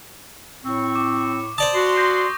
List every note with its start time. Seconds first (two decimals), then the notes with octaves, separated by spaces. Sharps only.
0.65 A2 C4 C#6
0.96 D6
1.58 C5 D5 A5 D#6
1.74 F#4 C6
1.96 C#6 G6 A#6